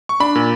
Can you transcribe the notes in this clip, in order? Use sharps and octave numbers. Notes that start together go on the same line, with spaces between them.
C#6
D4 B5
A#2